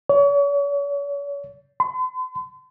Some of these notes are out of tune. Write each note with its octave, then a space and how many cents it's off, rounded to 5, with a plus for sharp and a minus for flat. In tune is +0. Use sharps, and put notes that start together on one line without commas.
C#5 +40
C6 -45